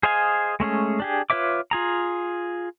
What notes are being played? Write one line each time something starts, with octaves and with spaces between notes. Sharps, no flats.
G#4 C5 D#5 F5 G#5
G#3 A3 C#4 G#4
D4 G4 G#4
F4 B4 C#5 E5 D6
F4 G#4 A#5